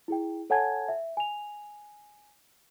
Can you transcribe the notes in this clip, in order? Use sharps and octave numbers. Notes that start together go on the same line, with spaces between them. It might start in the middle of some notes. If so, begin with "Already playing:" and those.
E4 G#4 G5
A4 C#5 F#5 G#5 A5 G#6
E5
G#5 F7